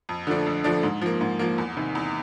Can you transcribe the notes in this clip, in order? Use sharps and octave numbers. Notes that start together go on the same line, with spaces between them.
F2
D3 F3 A3 D4
F2
D3 F3 A3 D4
G#2
F3 A#3
G#2
F3 A#3
E2
C3 D#3
E2